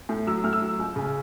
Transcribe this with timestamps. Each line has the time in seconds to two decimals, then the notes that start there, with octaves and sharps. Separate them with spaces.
0.09 A2
0.27 F#3 E6
0.44 A2 F6
0.53 E6
0.62 F#3
0.79 C#2
0.96 C#3